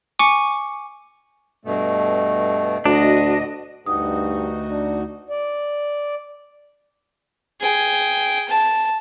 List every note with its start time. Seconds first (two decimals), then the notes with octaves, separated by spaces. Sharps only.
0.19 G#5 C#6 D6 C#7
1.65 G2 B2 A3
2.86 D2 D4 F#4 D#5
3.86 D2 G2 D#4 F#4 D#6
4.70 D4
5.28 D5
7.61 G#4 G5
8.49 A5